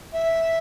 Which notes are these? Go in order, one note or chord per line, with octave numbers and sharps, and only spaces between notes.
E5